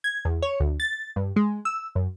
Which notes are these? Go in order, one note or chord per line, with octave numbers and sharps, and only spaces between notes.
G#6
E2
C#5
D2
A6
G2
G#3
E6
F#2